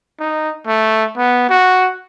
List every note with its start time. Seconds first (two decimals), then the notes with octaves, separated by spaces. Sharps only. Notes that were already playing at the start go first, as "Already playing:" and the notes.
0.20 D#4
0.67 A3
1.17 B3
1.50 F#4